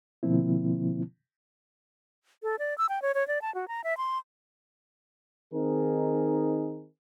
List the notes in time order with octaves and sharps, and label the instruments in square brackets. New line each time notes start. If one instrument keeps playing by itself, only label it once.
[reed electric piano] B2 D3 F3 A#3 C4 E4
[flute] A4
D5
E6
G5
C#5
C#5
D5
A5
F#4
A#5
E5
C6
[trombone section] D#3 C4 D#4 G#4 A#4